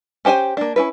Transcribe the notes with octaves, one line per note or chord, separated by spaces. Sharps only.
C#4 G4 C5 F5 G#5
A#3 D4
C#4 E4 B4